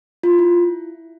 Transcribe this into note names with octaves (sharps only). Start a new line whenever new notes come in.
F4
E4